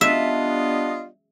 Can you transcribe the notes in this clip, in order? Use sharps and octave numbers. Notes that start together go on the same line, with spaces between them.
G3 B3 D4 F4 D#5 E5